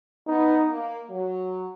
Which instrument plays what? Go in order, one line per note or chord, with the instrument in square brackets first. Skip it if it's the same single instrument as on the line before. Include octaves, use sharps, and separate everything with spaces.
[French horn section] B3 [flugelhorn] D#4
[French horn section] A#3
F#3